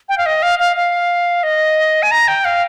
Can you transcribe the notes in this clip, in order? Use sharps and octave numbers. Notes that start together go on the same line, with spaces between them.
G5
F5
D#5
F5
F5
F5
D#5
G#5
A#5
G5
F5